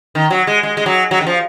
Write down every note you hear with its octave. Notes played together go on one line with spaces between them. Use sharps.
D#3
F#3
G#3
G#3
G#3
F#3
F#3
D#3
F3